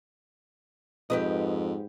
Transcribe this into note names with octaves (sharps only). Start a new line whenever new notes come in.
F2 G#2 G4 B4 D#5